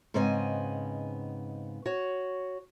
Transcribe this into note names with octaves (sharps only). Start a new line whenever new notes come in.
G#2 C#3 B3 C4 D#5 G#5
F#4 C#5